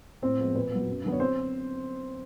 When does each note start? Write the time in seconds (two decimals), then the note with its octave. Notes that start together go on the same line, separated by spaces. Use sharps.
0.22 A2 C4 C5
0.39 F3 G#3 B3
0.55 A#2 B4
0.71 F#3 B3
0.88 F#2
1.04 D3 F#3 B3
1.13 C#5
1.20 C4 C5